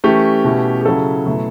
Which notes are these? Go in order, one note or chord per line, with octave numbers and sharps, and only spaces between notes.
E3 A3 C#4 G4
B2 A3 C#4 E4
G4
C#3 F#3 C#4 E4 A4
B2 F#3 A3 E4